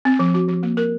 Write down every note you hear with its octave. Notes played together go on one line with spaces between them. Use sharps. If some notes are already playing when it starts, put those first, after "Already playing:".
C4
F3
F#4
F3
A#3
A#4